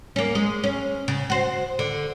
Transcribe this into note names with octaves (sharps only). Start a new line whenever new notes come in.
A#3 C#4
G#3
C#4
C#3
F#4 C5
D3